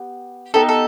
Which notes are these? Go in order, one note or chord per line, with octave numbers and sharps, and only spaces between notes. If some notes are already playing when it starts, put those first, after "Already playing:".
Already playing: B3 G4
B3 D#4 G4 A4
A4